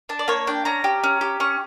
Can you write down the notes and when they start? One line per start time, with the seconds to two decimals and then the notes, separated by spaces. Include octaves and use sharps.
0.09 D4 A5
0.19 D5
0.28 A#3 C#5
0.47 D4 G5
0.65 C#4 A#5
0.84 G4
1.04 C#4
1.21 G4
1.40 C#4 C#6